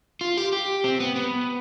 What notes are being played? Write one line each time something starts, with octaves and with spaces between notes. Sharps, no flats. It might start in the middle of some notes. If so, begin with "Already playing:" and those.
F4
G4
G4
C4
B3
B3